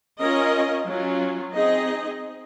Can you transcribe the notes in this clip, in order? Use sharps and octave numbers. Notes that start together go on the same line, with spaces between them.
C#4 F4 A#4 D#5
F#3 C#4 F4
C4 D#4 G#4 D#5